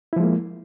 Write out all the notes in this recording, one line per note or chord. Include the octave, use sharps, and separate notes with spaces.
F3 G#3 A#3 E4